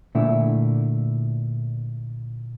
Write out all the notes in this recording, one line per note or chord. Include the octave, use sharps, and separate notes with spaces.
A#2 D3 A3 E4